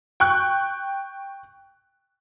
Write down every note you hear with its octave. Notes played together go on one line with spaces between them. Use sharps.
G5 C#6 F#6